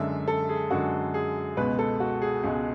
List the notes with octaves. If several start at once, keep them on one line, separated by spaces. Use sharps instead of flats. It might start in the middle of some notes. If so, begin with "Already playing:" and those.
Already playing: F#2 D3 G#3 E5
A4
G#4
F#2 D3 G#3 F#4
G#4
C#2 B2 G#3 B4
A4
F#4
G#4
C#2 B2 G#3